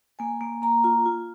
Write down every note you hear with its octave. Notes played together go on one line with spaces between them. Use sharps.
A#3 G#5
A#3
A#3 A#5
F4
F4